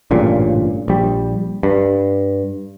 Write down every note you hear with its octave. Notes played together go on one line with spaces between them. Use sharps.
A1 G2 A#2 C#3
A#1 G3
G2